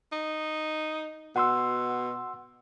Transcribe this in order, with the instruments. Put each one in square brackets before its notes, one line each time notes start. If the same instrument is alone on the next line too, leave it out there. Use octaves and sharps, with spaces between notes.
[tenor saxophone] D#4
[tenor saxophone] B2 [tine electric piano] F#5 C6 E6